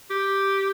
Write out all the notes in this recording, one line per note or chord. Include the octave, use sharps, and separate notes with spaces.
G4